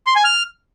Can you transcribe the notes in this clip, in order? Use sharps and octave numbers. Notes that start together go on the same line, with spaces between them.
C6
G#5
F6